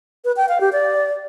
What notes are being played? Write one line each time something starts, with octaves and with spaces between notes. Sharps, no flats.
B4
G5
F5
G4
D5